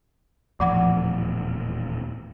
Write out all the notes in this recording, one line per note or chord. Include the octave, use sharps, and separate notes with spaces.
D#1 E2 A2 F3 F#5 D6